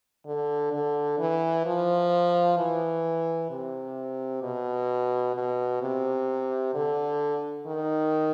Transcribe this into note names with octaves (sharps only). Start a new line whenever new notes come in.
D3
D3
E3
F3
E3
C3
B2
B2
C3
D3
D#3